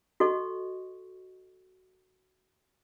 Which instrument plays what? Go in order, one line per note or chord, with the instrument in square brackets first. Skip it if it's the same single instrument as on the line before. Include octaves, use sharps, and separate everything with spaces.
[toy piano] F#4 A4 D#5 C#6